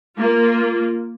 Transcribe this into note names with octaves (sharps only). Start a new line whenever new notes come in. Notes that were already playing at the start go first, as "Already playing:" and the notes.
A#3 F4